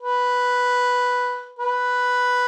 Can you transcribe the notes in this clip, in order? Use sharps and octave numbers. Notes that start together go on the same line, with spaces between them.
B4
B4